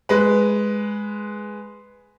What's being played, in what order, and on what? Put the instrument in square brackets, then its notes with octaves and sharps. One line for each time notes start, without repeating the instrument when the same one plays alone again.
[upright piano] G#3 B4